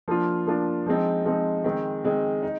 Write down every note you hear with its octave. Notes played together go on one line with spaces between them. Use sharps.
F3 A#3 D4 F4
F3 A#3 D4 F4
F3 G#3 C4 D#4
F3 G#3 C4 D#4
D#3 G#3 C4
D#3 G#3 C4
D#4